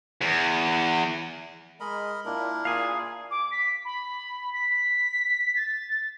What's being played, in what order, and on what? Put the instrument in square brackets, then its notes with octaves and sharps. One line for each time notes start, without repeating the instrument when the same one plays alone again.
[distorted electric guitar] E2
[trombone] G#3 [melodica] A#4 D#5 B5
[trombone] A#2 [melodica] D4 E4 A#4
[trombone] A#2 [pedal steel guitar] G#4 F5
[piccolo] D6
B6
B5
B6
A6